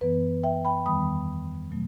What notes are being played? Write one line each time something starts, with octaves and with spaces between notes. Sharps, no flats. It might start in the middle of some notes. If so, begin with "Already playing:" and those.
F#2 E3 B3 B4
E5 G5
G5 B5
E2 D#3 G3 B3 B5 D#6
B2 F#3 A3